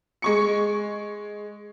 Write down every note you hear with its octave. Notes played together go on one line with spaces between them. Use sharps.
G#3 C#6 C#7